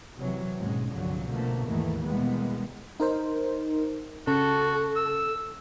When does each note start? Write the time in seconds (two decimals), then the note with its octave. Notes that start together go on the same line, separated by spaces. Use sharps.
0.18 C3 E3 F#3
0.59 D#2 G#2 B2 G#3 C#4
0.90 C2 G2 D3 F3 F#3
1.26 B2 D3 F3 A3 A#3
1.65 D#2 G#2 D#3 E3 A3 A#3
2.01 B2 E3 G3 G#3 A#3 B3
3.00 D#4 A#4 C5
4.27 C#3 F#4 A4
4.96 E6